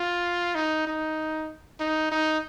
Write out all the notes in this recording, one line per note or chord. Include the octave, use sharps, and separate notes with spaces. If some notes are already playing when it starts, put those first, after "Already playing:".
Already playing: F4
D#4
D#4
D#4
D#4